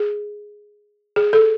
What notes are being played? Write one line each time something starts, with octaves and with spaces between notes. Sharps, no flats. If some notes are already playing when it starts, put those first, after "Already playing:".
Already playing: G#4
G#4
A4